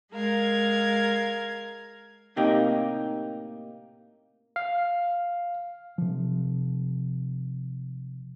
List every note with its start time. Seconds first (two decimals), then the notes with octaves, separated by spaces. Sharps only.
0.12 G#3 A#4 F5 G#6
2.36 A2 C3 A#3 D#4 G4
4.56 F5
5.98 C3 F3